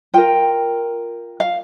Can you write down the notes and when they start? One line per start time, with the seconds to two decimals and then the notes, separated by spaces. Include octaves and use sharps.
0.14 F4 A#4 G5
1.40 F5